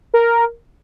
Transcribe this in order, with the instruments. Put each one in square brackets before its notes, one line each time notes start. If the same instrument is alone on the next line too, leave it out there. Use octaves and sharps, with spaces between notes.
[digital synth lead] A#4